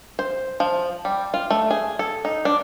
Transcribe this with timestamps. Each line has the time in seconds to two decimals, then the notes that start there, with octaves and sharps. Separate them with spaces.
0.19 C5
0.60 F3
1.05 G3
1.34 F4
1.50 A3
1.71 G#4
1.99 A4
2.25 D#4
2.45 D4